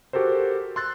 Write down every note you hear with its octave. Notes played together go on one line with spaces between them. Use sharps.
F#4 G4 A4 A#4 C5
C6 E6 F#6 A6